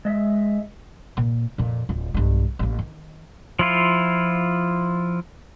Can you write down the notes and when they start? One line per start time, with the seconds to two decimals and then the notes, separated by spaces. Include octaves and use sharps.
0.05 G#3 D#5 E5
1.17 A#2
1.58 F2 A#2
1.89 D1 F4
2.14 B1 G2
2.59 A1 A#3
2.79 D#3
3.59 F3 E4 F4